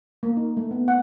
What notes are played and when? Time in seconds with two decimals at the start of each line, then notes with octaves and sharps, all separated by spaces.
0.23 A#3
0.37 D#4
0.57 A3
0.71 B3
0.88 F#5